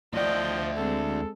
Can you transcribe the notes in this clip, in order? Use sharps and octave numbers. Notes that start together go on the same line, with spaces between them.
D2 F3 D5 D#5 G5
G#3 C4 A4